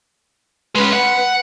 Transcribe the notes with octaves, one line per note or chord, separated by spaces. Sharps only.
G#3 C#4 B4
F#5